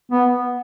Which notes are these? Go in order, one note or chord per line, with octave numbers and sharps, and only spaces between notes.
B3